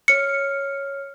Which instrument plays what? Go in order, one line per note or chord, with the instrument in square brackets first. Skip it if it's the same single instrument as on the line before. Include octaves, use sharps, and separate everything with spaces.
[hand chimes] C#5 F6 [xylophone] C#7